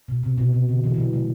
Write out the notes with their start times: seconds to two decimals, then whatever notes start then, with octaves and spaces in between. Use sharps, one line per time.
0.08 B2
0.23 C3
0.38 B2
0.53 C3
0.69 D3
0.84 E3
0.94 E3
0.98 F#3
1.13 A3